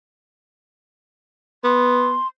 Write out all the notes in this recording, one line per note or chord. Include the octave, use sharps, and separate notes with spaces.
B3 C6